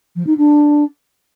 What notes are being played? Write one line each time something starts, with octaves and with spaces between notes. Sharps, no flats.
F3
D#4
D4